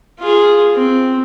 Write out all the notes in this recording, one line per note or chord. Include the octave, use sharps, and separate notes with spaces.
F4 G#4
C4